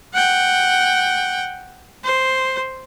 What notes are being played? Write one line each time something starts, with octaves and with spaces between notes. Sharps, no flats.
F#5 G5
C5